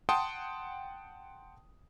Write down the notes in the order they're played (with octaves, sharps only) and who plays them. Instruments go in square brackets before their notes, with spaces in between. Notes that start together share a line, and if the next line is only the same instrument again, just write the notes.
[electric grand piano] F#5 G5 A5 C6 D#6